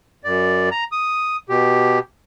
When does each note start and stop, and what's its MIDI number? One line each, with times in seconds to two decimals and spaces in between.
0.24 0.69 42
0.24 0.69 74
0.71 0.84 82
0.92 1.37 87
1.49 1.99 47
1.49 1.99 67